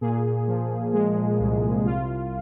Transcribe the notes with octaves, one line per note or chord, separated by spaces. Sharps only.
A#2 G#4
F3
G#3
C2
C2 F4